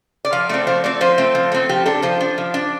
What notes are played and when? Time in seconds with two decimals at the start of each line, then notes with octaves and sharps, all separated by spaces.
0.25 D5
0.33 F3 F5
0.49 A3 C4 D5
0.67 F3 C5
0.84 A3 C4 D5
1.01 F3 C5
1.18 A3 C4
1.35 F3
1.52 A3 C4
1.69 F3 G4
1.86 D4 A4
2.02 F3 C5
2.20 D4
2.38 F3
2.54 D4